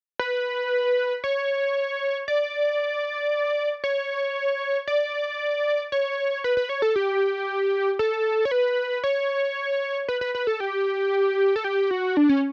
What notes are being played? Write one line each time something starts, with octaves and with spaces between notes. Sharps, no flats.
B4
C#5
D5
C#5
D5
C#5
B4
B4
C#5
A4
G4
A4
C#5
B4
C#5
B4
B4
B4
A4
G4
A4
G4
F#4
D4
C#4